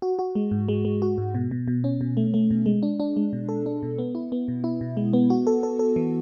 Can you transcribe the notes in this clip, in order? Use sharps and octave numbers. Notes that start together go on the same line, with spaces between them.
F#4
F#4
G#3
G#2
G#3
G#3
F#4
G#2
B2
B2
B2
C#4
B2
A3
A3
B2
G#3
D4
D4
G#3
B2
A4
D4
B2
B3
E4
B3
B2
E4
B2
G#3
B3
F#4
A4
A4
A4
E3